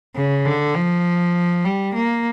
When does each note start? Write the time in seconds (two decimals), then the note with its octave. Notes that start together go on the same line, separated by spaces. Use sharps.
0.16 C#3
0.45 D3
0.75 F3
1.64 G3
1.94 A#3